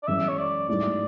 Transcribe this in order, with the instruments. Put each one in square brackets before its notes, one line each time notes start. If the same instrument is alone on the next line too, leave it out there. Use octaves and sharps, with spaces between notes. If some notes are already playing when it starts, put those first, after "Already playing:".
[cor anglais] D5
[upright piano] F#2 E3 G#3 C#4 [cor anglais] E5
[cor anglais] C#5
D5
[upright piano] G#2 F#3 A3 E4 [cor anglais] D5